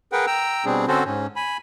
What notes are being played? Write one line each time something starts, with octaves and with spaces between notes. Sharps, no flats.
G#4 A#4 B4 F#5 G5
G5 A#5 E6
B2 G3 C4 D4 G#4
D3 C4 C#4 F#4 A4 C5
G#2 C#4
G#5 B5